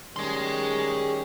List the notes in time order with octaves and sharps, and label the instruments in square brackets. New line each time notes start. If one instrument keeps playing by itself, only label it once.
[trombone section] D#3 G3 C#4 [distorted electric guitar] G#4 C6